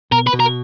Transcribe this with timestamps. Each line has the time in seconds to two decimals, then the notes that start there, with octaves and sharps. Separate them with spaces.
0.12 B2 A#4
0.27 B4
0.33 B2
0.40 A#4